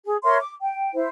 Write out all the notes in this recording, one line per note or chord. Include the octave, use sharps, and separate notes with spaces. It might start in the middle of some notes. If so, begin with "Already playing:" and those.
G#4
A#4 C#5 E5 C6
D6
G5
E4 C5